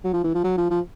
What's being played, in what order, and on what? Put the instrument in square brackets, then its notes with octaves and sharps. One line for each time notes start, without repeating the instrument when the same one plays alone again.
[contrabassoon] F#3
F3
E3
F3
F#3
F3
F3